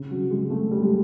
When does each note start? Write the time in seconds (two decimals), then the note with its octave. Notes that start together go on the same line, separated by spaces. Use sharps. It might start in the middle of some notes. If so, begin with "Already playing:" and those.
Already playing: C#3
0.11 F#3
0.31 G#3
0.50 A3
0.61 G#3
0.71 G3
0.82 G#3